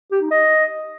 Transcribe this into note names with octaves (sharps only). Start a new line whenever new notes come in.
G4
D#4
D#5